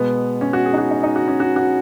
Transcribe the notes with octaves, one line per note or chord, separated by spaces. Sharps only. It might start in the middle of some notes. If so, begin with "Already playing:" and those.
Already playing: B2 G#3 B3
C#4
F#4
G#4
D#4
F#4
D#4
D#4
F#4
C#4
F#4
F#4